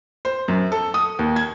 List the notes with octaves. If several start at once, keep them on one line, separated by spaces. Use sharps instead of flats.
C5
F#2
A4
D#6
D#2
G#6